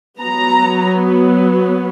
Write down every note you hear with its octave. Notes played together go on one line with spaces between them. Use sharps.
F#3 B3 A#5